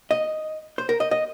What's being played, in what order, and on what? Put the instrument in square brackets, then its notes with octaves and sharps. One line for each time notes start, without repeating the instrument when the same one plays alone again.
[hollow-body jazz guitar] D#5
C5
A#4
D#5
D#5